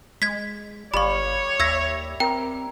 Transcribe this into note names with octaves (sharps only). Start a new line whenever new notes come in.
G#3 G#6 B6
G1 G3 C#5 F5 B5 C#6
D#2 E5 E6 G#6 A#6
C4 A#4 G5